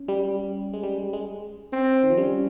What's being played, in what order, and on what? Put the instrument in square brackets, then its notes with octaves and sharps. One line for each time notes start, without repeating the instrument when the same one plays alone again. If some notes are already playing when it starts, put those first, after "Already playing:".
Already playing: [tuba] C#4
[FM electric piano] G3
G3
G#3
G3
G3
G#3
[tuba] C4
[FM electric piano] D#3
F3
[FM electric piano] G3 [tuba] C#4